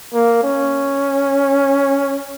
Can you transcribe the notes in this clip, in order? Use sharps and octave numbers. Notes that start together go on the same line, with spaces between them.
A#3
C#4